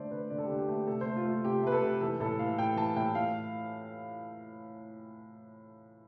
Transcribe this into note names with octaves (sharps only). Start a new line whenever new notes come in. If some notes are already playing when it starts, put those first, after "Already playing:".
Already playing: D3 A3 C5 D5
D3 B4
D3 D5
A4
D3 G4
G4
A3
G4
C3 A4
A3 C5
F4
A3
F4
C3 G4
A3 B4
A4
C3
E3 A4
A2 A4
E3 F5
A2 G5
E3 A5
A2 G5
A2 F5